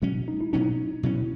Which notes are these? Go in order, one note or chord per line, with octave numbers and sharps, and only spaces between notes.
B2 F#3 G#3 C#4
D#4
E4
B2 F#3 C#4 D#4
B2 F#3 C#4 E4